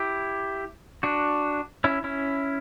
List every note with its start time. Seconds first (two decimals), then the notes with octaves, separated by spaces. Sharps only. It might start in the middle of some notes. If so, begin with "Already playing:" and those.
Already playing: E4 G4
1.03 D4 F#4
1.84 C#4 E4
2.04 C#4 E4